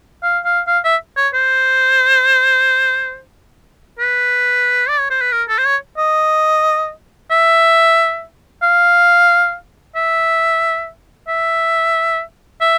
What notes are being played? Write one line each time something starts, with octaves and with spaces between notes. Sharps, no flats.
F5
F5
F5
E5
C#5
C5
B4
D5
C#5
C5
B4
A#4
A4
C5
C#5
D#5
E5
F5
E5
E5
E5